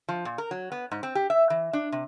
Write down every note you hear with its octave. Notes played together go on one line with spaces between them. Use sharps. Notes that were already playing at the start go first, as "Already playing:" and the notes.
F3
A#2
A#4
F#3
B3
G#2
C4
G4
E5
E3
D4
C3